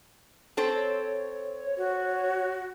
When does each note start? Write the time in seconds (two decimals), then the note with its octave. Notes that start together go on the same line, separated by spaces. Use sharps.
0.57 C4 A4 C5 C#5
1.77 F#4